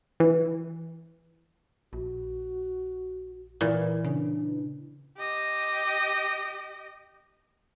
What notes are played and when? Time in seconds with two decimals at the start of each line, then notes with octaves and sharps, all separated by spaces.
0.20 E3
1.93 A#1 F#4
3.61 A#2 E3 A#4
4.04 C#3 D4
5.17 G4 D#5